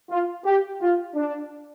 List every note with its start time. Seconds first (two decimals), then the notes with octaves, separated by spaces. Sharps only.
0.10 F4
0.45 G4
0.81 F4
1.15 D4